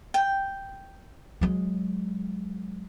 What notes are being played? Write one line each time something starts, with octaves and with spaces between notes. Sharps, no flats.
G5
F#3 G#3